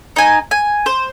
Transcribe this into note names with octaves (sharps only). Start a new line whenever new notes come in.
D#4 G#5
G#5
C5